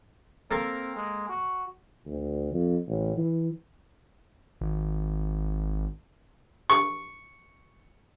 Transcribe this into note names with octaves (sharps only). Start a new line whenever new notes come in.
A#3 C4 A4 A#4
G#3
F#4
D2
F2
A1
E3
G#1
C#6